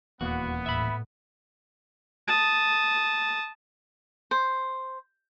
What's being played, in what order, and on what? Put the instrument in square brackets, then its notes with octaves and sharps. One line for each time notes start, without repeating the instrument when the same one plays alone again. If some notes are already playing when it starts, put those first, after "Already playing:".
[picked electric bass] D#1 E2 A#3 [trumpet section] B3 [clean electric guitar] F#4
[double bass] A2 [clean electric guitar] E5 B5
[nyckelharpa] A5 D#6
[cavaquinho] C5